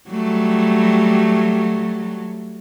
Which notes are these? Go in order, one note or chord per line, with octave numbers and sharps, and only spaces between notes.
F#3 G3 A3